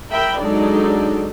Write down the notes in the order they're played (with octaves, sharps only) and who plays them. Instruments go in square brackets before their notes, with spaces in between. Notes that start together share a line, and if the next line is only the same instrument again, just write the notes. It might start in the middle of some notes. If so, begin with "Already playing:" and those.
[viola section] A#4 E5 G5 B5
F#3 G#3 D4 D#4 A4 D5